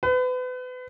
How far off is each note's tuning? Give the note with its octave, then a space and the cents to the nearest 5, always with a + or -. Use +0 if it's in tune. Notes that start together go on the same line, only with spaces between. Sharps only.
B4 +35